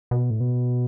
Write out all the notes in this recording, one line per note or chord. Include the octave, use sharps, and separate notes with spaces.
B2
A2
B2